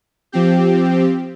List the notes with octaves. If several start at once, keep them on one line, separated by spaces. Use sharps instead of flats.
F3 C4 G4